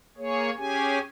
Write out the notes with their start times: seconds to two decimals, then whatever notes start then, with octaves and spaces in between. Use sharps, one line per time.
0.17 A#3 G#4 C#5
0.57 C#4 G4 G#4 G#5